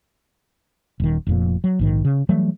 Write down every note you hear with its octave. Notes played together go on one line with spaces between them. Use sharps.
D#1 D#3
F1 F2 A#2
F#3
A#1 G#2 D#3
C#3
E3 F#3 G3 A3